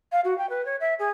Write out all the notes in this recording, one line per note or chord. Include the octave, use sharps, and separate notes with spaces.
F5
F#4
G5
B4
C#5
E5
G#4